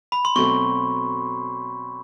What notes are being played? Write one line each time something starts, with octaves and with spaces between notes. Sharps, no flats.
B5
C6
B2 F#3 A3 C4 C#6